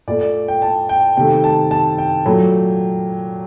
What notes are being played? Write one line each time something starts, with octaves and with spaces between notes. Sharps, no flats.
A#2 A3 D5
D5
G5
A5
G5
C3 D#3 A3 G5
A5
A5
G5
A#2 F#3 A3